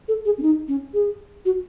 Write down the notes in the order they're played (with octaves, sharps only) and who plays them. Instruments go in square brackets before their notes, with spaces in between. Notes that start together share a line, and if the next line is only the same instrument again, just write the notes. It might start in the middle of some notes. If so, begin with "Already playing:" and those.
[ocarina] A4
G#4
C#4
D#4
C#4
G#4
F#4